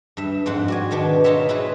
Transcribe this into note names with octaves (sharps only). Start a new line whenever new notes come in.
G2 E5
F2 G#2 C4 F#5
F#4 D5 G#5
B2 D#3 B3 D4
D#4 F4 A#4 C#5 E5
C4 E4 G#4 B4